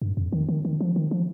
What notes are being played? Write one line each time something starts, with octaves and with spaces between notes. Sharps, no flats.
G2
F2
D#3
D#3
D#3
F3
D#3
F3